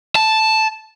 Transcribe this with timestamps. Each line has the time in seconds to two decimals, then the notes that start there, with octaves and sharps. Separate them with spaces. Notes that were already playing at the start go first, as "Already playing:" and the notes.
0.16 A5